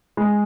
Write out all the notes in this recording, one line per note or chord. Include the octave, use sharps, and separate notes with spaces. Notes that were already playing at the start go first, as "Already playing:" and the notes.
G#3